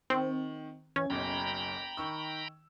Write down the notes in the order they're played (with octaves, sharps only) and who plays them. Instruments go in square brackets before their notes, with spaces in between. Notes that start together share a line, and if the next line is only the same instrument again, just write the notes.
[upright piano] D#3 [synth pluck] C4
[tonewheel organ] E3 [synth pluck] C#4 [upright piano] G#6
[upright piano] F#1 B1 F#2 [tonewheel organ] G5 A#5 B5
[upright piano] D#3 C#6 E6